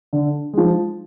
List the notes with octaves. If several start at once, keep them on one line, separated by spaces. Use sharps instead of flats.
D3
F3 G#3